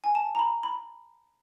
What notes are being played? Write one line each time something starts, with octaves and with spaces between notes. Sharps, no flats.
G#5
A5
A#5
B5
B5